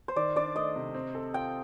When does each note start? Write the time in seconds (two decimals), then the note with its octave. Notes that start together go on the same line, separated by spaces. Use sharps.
0.08 C5
0.16 D#3 D5
0.36 D4 D5
0.56 A3 D#5
0.76 C3
0.94 C4
1.15 A4
1.33 F4 G5